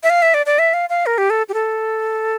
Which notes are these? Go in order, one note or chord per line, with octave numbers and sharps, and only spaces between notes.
E5
F5
E5
D5
D5
E5
F5
F5
A#4
G4
A4
G4
A4